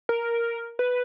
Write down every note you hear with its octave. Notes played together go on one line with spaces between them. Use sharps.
A#4
B4